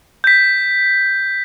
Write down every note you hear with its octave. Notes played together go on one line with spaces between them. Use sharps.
G6 B6